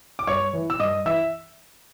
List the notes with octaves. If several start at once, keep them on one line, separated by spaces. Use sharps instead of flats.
D6
G2 C#5 C#6
E3
E6
G2 D#5 D#6
E3 E5 E6